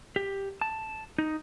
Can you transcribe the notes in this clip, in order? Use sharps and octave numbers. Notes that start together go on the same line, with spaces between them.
G4
A5
D#4